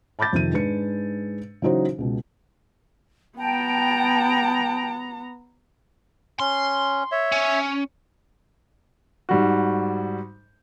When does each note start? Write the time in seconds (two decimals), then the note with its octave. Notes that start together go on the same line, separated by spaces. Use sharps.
0.19 A5 B5 D6 G6 A6
0.33 F2 C3 D#3 D#7
0.51 G#2 G#3 D4 B4 C#7
1.62 C#3 E3 F#3 D#4 F#4 C5
1.98 C#2 B2
3.39 B3 G5 A5 A#5
6.40 C#4 C6
7.12 C#5 E5
7.32 C#4
9.29 G#2 G3 F#4